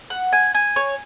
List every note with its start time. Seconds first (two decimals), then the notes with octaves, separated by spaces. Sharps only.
0.10 F#5
0.32 G#5
0.54 G#5
0.76 C#5